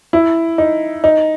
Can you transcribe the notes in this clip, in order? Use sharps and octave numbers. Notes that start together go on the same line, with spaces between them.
E4
D#4
D#4